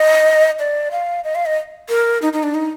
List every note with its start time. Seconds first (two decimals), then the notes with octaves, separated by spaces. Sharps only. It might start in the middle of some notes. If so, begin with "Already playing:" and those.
Already playing: D#5
0.59 D5
0.91 F5
1.24 D#5
1.35 F5
1.46 D#5
1.89 A#4
2.22 D#4
2.33 D#4
2.43 D4
2.54 D#4